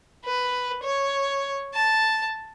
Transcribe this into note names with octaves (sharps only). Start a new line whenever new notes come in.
B4
C#5
A5